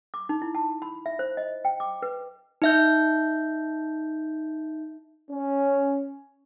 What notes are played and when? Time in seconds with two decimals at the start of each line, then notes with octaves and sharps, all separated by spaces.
0.14 D6
0.29 D#4
0.42 E4
0.55 A5
0.82 B5
1.06 E5
1.19 C5
1.37 D#5
1.65 G5
1.80 D6
2.02 B4
2.62 D#4 E5 G6
5.30 C#4